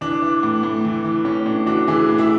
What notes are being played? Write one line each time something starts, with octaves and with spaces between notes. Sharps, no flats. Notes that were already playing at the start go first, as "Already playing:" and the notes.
E3 D4
E3
A2
A2
E3
E3
A2 C#4
A2 D4
E3 D4 F#4
E3 E4 G#4
A2
E4 G#4